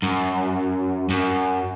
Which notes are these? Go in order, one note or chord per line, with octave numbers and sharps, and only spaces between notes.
F#2
F#2